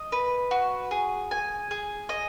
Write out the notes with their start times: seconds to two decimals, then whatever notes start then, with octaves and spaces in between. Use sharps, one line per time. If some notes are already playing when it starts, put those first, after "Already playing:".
Already playing: D#5
0.12 B4
0.51 F#4
0.91 G#4
1.31 G#5
1.71 G#4
2.09 D#5